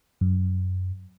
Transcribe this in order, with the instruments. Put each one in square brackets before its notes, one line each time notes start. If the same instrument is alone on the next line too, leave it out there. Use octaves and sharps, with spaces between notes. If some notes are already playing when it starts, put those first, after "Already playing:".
[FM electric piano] F#2